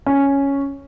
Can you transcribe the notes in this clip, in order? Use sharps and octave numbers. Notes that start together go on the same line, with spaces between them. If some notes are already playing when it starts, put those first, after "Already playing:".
C#4